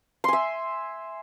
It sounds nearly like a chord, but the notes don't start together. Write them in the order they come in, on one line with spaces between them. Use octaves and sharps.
C6 G#5 E5